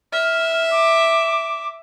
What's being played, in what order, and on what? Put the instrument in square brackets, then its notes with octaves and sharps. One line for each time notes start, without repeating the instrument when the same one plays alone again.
[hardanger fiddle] E5 [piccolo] F6
[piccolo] D6